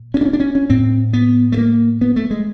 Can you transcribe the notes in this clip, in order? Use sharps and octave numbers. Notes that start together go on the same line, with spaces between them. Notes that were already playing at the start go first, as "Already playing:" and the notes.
Already playing: A#2
C#4
D4
C#4
D4
C#4
C#4
A2 C4
B3
A3
A#3
B3
A3
G#3